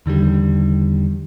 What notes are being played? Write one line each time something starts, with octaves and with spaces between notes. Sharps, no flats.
E2 D3 D#3 G3